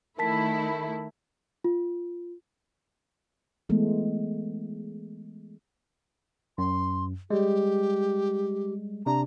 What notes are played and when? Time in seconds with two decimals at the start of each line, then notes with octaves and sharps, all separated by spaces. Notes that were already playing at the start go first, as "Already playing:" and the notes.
0.18 D#3 A3 E4 A#4 A5 B6
1.64 F4
3.69 E3 G#3 A3 B3
6.58 F#2 C6
7.30 G3 G#3 G4
9.06 C3 D4 A#5